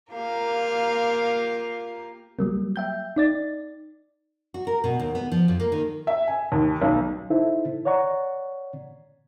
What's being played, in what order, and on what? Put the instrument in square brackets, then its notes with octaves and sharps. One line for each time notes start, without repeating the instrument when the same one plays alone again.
[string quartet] A#3 F4 G4 A#4 F5
[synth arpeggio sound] F#3 G3 A#3
E5 G5 G6
D#4 D5 A6
[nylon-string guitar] F#4
A#4
B2
D#2
B3
F3
F2
A#3
D#3
[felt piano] E5
G#5
D#2
B1
[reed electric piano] D#4 E4 A4 C5 E5
C#5 D5 F#5 A#5 C#6